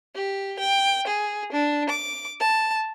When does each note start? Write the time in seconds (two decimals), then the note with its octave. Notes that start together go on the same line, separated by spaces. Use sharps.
0.15 G4
0.59 G5
1.07 G#4
1.52 D4
1.89 D6
2.40 A5